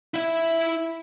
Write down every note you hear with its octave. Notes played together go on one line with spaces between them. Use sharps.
E4 E5